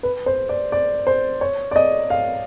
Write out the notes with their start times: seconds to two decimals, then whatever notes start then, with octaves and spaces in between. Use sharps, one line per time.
0.03 B4
0.26 C5
0.49 D5
0.72 D5
1.07 C5
1.41 C#5
1.71 D5
1.76 D#5
2.10 F5